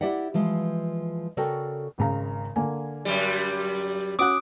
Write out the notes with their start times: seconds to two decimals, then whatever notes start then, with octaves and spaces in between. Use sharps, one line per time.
0.01 E4 G4 D5 E5 F#5
0.34 E3 F3 G#3
1.37 C#3 F#4 A4 A#4 D5 G5
1.98 G#1 C#3 A#5
2.56 D3 A#3 G#5
3.05 F#2 G3
4.19 C#4 F#4 D6 D#6 F#6 D7